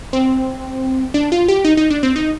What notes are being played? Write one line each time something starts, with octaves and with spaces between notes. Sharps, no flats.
C4
D4
F4
G4
D#4
D#4
D4
C4
D#4